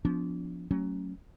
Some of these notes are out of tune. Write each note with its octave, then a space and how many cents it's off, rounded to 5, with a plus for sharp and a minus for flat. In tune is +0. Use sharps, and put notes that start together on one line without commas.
F3 +0 B3 +0 D4 -30
F#3 +15 A3 +20 C#4 +0